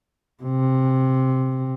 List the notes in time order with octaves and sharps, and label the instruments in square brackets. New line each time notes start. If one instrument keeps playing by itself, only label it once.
[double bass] C3